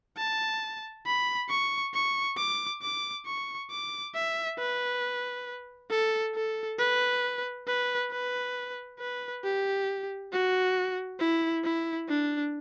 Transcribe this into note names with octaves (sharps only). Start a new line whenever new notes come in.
A5
B5
C#6
C#6
D6
D6
C#6
D6
E5
B4
A4
A4
B4
B4
B4
B4
G4
F#4
E4
E4
D4